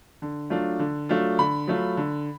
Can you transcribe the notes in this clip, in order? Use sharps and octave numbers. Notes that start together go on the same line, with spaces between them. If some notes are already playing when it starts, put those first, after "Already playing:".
D3
F#3 A3 D4 F4
D3
F#3 A3 D4 F4
D3 B5
F#3 A3 F4
D3